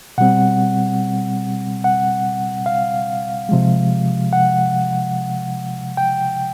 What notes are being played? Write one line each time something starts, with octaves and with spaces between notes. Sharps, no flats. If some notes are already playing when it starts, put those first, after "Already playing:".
B2 G3 C4 F#5
F#5
F5
C3 F3 G#3
F#5
G5